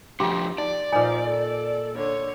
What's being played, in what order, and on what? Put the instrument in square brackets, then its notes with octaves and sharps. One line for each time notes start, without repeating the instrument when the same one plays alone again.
[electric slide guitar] D3 F3 A3 [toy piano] F4 C6 [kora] G4
[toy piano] D#4 [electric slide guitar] D5
[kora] A#2 D#4 [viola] F3 [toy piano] B4 G#5
[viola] A4
D3 C#5